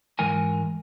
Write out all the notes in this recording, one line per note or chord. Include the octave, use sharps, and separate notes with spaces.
G#2 E3 G#3 A#4 G#5